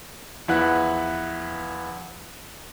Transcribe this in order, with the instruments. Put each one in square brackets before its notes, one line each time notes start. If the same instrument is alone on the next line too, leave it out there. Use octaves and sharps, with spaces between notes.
[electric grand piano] E2 F3 E4 B4 F#5 F#6